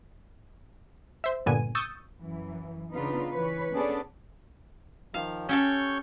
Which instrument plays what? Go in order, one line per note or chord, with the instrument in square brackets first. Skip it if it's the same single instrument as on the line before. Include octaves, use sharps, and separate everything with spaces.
[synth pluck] C5 E5
G2 A#2 D3 B3 G#5 D#7
C#6 D#6 E6 G6 A6
[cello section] F#2 E3
C#3 B3 D4 D#4 F4 B4
E3 B4 C#5
B3 C#4 D4 G#4 A4 D5
[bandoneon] D#3 F3 [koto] F5
[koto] C#4 G4 A4 [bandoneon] C#5 C#6 G6